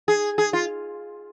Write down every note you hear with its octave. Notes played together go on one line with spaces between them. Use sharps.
G#4
G#4
F4